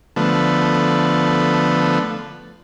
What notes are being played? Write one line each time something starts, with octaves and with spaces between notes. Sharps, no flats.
D3 F3 A3 B3